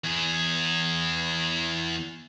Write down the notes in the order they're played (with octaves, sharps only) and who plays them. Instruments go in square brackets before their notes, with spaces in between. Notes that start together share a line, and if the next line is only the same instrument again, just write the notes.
[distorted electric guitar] E2 G#4